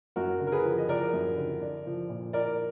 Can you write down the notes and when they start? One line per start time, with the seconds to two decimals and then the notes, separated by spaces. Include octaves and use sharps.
0.16 F#2 F#4 A#4
0.40 D3
0.47 A#4
0.52 G#4 B4
0.65 F3
0.78 D#5
0.89 F3 A#4 D5
1.14 F#2
1.37 D3
1.61 D4
1.86 F3
2.09 A#2
2.33 D4 A#4 D5